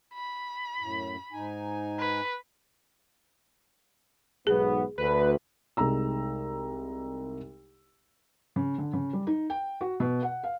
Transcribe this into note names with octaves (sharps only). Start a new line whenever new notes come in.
B5
F#2 A2
G#2 D#4 G#5
B4
B1 G#2 B3 G#4
D2 B4
C2 G#3 D#4 A#5 E6
C#3
D3
C#3
G3
D#4
G5
F#4
B2
F#5
F5